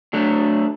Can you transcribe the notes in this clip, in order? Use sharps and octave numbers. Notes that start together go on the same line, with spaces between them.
F#3 A3 D4